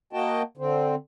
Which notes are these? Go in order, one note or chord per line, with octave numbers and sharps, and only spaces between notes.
A#3 F#4 D#5 G5 A5
D3 C4